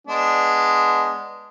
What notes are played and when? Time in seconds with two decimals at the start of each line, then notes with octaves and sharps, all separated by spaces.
0.07 G#3 B3 D4